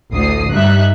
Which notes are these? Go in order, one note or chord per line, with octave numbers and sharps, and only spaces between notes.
A1 D2 D#6 C7
G2 G3 D#4 E5 F#6